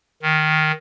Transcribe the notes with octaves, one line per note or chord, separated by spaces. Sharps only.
D#3